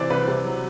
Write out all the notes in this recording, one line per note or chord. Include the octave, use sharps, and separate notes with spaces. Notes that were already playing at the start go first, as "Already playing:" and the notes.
Already playing: C3 E3 C5 D5
C2 B4
C3
F#3